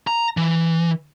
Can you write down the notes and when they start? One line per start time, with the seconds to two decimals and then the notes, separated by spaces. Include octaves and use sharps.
0.07 A#5
0.37 E3